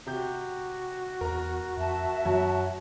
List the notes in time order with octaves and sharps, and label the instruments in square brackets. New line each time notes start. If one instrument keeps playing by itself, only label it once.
[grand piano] C3 G4 G6 [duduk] F#4
[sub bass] E2 [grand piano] A#4 A#5
[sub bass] F2 [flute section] E5 A5
[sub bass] F#2 [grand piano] F#3 [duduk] F#4